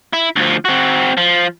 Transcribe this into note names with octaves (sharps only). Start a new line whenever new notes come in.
E4
D2 F3
C4 F#4
F3